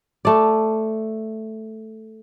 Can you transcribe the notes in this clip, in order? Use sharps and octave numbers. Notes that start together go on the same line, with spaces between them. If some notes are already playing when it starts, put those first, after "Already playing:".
A3 D5